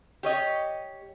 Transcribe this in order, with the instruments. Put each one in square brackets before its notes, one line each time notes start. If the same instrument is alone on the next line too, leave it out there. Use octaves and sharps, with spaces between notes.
[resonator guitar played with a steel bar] G4 C#5 D#5